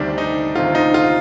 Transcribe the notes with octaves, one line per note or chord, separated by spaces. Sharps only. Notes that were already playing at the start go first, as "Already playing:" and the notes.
Already playing: D2 C3 D#3 G3 D4
D#4
D2 C3 D#3 F4
D#4
F4